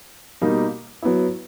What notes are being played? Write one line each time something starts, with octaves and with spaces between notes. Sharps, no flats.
B2 G3 A#3 D#4
F#3 B3 E4